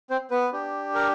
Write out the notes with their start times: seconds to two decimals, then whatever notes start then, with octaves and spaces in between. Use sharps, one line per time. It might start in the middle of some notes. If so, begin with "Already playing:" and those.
0.10 C4 C5
0.31 B3 B4
0.53 D4 G4
0.95 A#4